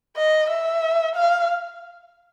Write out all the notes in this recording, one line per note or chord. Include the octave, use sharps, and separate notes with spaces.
D#5
E5
F5